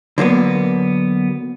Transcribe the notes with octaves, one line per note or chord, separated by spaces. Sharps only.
D3 F#3 A#3 B3